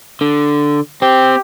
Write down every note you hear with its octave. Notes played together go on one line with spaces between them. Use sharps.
D3
C4 G4